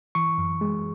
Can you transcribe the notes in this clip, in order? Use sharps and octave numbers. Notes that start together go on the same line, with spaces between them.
E3 C#6
F#2
G#3